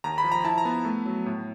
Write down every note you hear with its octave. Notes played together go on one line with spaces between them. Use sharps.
D#2 A#5
B5
F3
A#5
E4 A5
A#5
B3
A3
F#3
A2